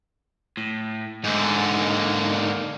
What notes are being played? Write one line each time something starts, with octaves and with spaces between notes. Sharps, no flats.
A2
G#2 D3 D#4 G#4
A#3